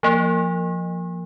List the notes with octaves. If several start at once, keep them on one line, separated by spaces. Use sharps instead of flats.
F3 A#3